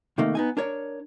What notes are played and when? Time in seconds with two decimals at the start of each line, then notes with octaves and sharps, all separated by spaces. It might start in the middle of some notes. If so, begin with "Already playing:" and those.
0.18 C3 D#3 A3 A#3 D#4
0.35 B3 D#4 G#5
0.57 D4 A#4 C#5